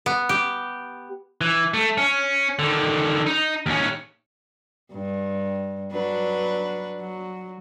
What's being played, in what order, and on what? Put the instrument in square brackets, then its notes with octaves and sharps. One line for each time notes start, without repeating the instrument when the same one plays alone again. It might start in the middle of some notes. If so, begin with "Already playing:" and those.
[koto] B3
G4
[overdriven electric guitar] E3
A3
C#4
D3 D#3
D#4
D#2 C#4
[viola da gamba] G2
F#3 D4 B4
F#3